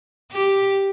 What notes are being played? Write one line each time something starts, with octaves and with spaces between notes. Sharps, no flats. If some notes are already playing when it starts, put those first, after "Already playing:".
G4